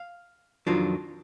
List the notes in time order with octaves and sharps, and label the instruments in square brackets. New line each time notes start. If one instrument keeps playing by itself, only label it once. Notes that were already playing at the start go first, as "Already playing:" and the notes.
Already playing: [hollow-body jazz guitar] F5
F2 D#3 F#3 D4 F4